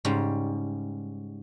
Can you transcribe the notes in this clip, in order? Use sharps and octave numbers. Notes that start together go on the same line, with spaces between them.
G#2 C#3 G3